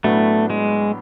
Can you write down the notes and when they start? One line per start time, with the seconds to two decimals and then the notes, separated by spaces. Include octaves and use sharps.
0.04 A2 F#3 A3 B3 D4
0.50 G#3